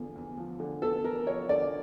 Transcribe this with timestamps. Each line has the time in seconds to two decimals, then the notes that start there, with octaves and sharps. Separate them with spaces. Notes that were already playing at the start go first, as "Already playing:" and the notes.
Already playing: E2 D3 F3
0.16 E2
0.37 F3
0.60 D3
0.82 E2 A4
1.05 E2 A#4
1.27 F3 C#5
1.49 D3 D5